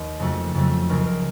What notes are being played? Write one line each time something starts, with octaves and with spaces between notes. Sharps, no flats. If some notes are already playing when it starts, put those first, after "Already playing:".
Already playing: D#2
F2 C#3 F#3 A3 F#4
F2 C#3 F#3 A3
C#2 C#3 F#3 A#4
A#4